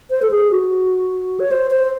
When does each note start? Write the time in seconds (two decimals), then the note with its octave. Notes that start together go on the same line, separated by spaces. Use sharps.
0.10 C5
0.22 A4
0.31 G#4
0.51 F#4
1.40 C#5
1.51 C5
1.71 C5